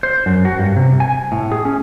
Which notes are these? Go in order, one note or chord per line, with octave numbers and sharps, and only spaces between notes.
C5
F#2
F#4
G2
C3
G#5
A2
G#4
C#4